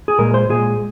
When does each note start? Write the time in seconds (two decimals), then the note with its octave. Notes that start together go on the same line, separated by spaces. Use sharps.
0.08 G#4
0.18 A#2 G#3 A#4
0.34 C5
0.49 A#2 G#3 G#4